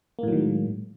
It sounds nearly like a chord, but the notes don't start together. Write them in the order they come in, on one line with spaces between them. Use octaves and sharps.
A#3 A2 F#3 D#3 G#3